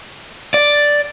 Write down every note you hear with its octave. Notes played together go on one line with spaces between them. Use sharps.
D5